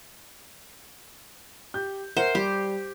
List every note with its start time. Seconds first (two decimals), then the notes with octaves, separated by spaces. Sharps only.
1.74 G4 G6
2.17 A#4 C5 E5 F#5
2.35 G3 G4